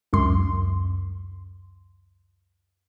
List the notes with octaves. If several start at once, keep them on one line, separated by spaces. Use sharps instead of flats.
C#2 F#2 C6